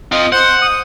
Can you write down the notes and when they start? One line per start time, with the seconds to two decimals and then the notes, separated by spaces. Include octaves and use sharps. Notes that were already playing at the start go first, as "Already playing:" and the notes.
0.12 C4 F4 D#5
0.32 C5 F#5
0.62 D#6